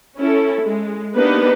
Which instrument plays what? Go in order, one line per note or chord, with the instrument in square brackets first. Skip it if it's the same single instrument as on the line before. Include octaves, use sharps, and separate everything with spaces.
[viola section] C#4 E4 A4
G#3
A#3 B3 D4 D#4 G4 B4